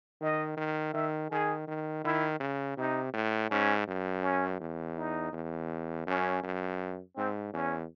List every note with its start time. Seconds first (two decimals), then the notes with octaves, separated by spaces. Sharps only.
0.21 D#3 D#5
0.57 D#3
0.94 D#3 E5
1.31 D#3 G#4
1.68 D#3
2.04 D#3 E4
2.40 C#3
2.77 C3 D#4
3.13 A2
3.51 G#2 C#4
3.87 F#2
4.23 C#4
4.60 E2
4.97 D#4
5.33 E2
6.07 F#2 C#4
6.43 F#2
7.17 G#2 C4
7.53 E2 C#4